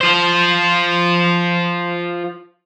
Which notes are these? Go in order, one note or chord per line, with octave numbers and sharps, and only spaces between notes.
F4 C5